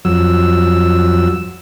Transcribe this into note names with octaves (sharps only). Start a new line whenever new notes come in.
F2 F#3 E6